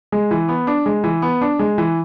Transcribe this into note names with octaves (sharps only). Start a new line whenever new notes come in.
G#3
E3
B3
D4
G#3
E3
B3
D4
G#3
E3